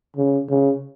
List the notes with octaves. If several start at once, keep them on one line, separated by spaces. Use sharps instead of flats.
C#3
C#3